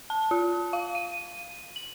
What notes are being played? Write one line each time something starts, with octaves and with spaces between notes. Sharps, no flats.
A5
F4
F5
D#7
F#7